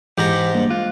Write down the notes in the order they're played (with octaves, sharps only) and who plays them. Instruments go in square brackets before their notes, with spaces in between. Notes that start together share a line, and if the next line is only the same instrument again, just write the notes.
[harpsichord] G#2 A#5 [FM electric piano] E3 [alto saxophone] G4
[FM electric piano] G3 A#3 D4
[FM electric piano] G#3 F#6 [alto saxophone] F4